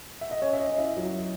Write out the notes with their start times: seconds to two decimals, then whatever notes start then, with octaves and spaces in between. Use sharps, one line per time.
0.21 E5
0.31 D#5
0.42 C#4 C#5
0.53 E5
0.60 D#5
0.69 C#4
0.78 E4 E5
0.97 F#3